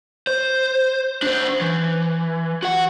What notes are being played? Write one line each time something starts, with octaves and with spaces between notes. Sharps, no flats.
C5
D4 C5
E3
F#4 F#5